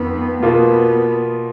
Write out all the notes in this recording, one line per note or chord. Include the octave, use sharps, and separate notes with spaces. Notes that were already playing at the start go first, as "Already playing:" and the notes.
Already playing: F2 D#3 B3
B2 A#3 B3 F4